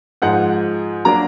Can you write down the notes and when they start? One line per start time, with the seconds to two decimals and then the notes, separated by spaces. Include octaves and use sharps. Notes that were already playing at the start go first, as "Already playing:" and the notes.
0.22 G#2 F3 G#3 D#4 F#5
1.05 F#3 A#3 D4 A#5